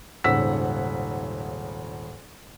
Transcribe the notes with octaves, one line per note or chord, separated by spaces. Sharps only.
D#1 G#1 C#3 F#5 E6 B6